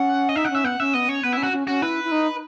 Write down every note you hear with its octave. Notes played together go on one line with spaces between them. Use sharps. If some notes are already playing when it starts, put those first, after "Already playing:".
Already playing: C#4 F#5
D#5
D#4 E5
F#5
C#4 E5
B3 F#5
C#4 E5
B3 D#5
C#4 C#5
B3 B4
E4
C#4
F#4
C#4
C#4 F#4
E4 B4
E4
D#4